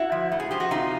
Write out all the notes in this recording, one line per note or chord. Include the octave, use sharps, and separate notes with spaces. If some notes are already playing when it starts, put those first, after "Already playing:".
Already playing: E4 F#4
F3
A2
G#4
F3 G4
F#4
C3 D#4 F4